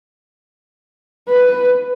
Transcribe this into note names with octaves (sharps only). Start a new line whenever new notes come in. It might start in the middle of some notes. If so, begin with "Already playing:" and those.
B4